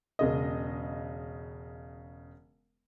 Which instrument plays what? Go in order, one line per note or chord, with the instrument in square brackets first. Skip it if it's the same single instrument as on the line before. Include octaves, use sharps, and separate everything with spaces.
[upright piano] E1 C#3 D#5